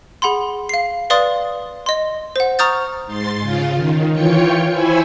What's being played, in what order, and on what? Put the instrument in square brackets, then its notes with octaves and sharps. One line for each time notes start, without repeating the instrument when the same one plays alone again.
[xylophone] G#4 F#5 B5 C6
F5 C7
B4 D5 F5 C6 D#6 A6
D#5 C6
C5 F#5
A#5 C#6 D#6 F6 G6 A6
[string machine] G#2 C6 A6
C#3 F4
D#3
E3 F4 C#5 G5 C#7
E4 C5 G#5 B5 C#6 E6